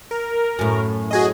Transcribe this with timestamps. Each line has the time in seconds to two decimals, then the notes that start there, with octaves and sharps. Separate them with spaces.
0.11 A#4
0.59 F#2 A2
1.11 F#4 G#4 D#5